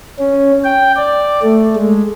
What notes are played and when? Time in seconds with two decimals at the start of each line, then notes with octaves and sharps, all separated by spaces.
0.19 C#4
0.64 G5
0.96 D5
1.42 A3
1.76 G#3